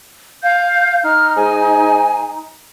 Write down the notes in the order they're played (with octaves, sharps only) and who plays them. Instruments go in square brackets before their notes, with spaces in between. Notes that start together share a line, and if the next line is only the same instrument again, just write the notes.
[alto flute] F5 [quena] G6
[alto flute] D#4 [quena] F6
[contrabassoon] G#2 [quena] G#5